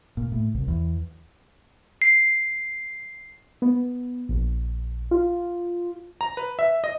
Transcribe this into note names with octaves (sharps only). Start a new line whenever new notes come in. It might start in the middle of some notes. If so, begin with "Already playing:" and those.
A#2
A2
C2
E2
C7
B3
A#1
F4
A#5
B4
E5
D#5